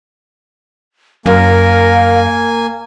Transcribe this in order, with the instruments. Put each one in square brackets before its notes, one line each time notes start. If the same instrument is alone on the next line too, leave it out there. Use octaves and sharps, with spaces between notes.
[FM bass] F#2 [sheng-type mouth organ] A#3 G#5 [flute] A#4 [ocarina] F5